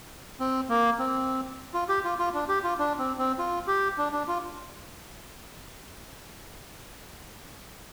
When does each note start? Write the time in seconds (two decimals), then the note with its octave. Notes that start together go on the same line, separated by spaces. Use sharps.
0.40 C4
0.69 A#3
0.99 C4
1.74 F4
1.89 G4
2.04 F4
2.19 F4
2.34 D4
2.48 G4
2.63 F4
2.79 D4
2.99 C4
3.18 C4
3.38 F4
3.67 G4
3.98 D4
4.13 D4
4.28 F4